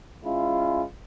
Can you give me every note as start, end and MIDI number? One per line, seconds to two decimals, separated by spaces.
0.24 0.83 56
0.24 0.83 61
0.24 0.83 64
0.24 0.83 65